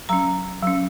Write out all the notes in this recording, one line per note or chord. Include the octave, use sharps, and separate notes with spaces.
F#3 C#4 A#5
F#3 C#4